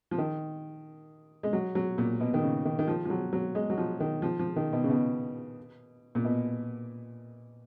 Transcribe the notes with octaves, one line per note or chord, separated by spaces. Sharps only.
F3
D#3
G#3
F#3
F#3
A#2
B2
D#3
C#3
D#3
D#3
F3
F3
F#3
F#3
G#3
F#3
F3
D#3
F3
F3
D#3
B2
C#3
B2
A#2
B2